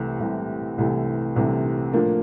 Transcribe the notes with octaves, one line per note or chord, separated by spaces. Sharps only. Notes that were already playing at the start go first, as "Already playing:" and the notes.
Already playing: C2 C3 E3 A3
C2 C3 E3 A3
C2 C3 E3 A3
C2 C3 E3 A3
A2 F3 A#3 D4